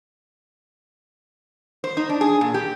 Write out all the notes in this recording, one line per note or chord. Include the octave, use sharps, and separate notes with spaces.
C5
D#4
D4
G#4
A#2
G4